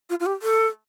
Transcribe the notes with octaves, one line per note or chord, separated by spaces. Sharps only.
F4
F4
G4
A4